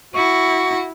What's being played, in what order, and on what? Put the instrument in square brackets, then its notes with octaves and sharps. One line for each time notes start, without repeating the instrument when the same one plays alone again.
[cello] E4 [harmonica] F#4 [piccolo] C#6